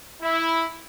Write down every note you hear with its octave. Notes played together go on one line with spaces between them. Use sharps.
E4